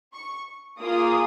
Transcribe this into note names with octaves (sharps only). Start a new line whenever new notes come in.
C#6
A#3 F4 G#4 D#6